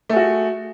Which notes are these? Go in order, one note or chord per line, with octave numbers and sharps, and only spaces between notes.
A3 F#4 G#4